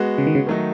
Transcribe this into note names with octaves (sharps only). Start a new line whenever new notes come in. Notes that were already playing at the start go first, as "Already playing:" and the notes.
Already playing: G#3 B3 F#4
C#3
D#3
C#3
D#3 F#3 A3 D#4